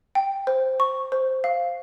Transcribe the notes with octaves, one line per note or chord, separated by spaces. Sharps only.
G5
C5
C#6
C5
F5